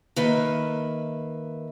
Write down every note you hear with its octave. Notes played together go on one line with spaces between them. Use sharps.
D#3 A#3 B4 E5